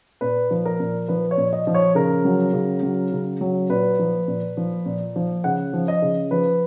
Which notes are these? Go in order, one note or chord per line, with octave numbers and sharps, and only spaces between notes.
A#2 B4
F3
A#4
A#2
F3 B4
C#5
A#2
D#5
F3
C#5
C#3 A#4
F#3
C#3
F#3
C#3
F#3
A#2 B4
F3
A#2
F3
A#2
F3
C#3 F#5
F3
D#5
C#3
F3 B4